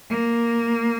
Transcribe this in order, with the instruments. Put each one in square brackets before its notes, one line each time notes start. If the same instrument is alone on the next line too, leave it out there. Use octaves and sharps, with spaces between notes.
[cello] A#3